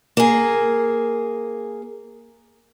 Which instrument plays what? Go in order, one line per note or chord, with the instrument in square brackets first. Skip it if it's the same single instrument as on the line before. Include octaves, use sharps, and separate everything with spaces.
[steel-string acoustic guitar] A#3 G#4